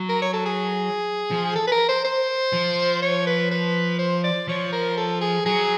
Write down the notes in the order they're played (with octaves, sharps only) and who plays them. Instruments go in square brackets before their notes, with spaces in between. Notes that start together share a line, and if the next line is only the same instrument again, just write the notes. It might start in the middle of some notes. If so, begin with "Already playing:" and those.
Already playing: [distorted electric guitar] F#3
[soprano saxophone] A#4
C#5
A4
G#4
[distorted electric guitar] F3
[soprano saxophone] A4
B4
A#4
C5
C5
[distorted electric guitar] F3
[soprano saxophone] C#5
B4
B4
C5
D5
[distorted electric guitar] F3 [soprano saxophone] C#5
[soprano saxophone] A#4
A4
G#4
[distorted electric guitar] F#3 [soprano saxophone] G#4